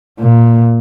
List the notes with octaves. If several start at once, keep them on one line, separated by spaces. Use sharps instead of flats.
A#2